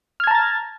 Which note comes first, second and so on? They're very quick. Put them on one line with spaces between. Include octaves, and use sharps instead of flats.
F6 G#6 A5 A#5 A6